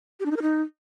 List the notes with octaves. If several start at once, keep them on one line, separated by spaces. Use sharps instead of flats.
G4
D4
D#4
A#4
D#4